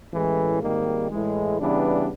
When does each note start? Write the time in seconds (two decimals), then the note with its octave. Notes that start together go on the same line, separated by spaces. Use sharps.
0.11 A1 A2 E3 G#3
0.61 G#1 G#2 D#3 G3 A#3
1.10 A2 E3 G#3
1.59 C#3 E3 G3 B3 D4